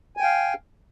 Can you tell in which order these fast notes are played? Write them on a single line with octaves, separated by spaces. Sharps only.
G#5 G5 F5